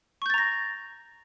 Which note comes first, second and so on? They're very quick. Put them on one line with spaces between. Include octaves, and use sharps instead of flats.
C#6 G6 A6 A#5 A#6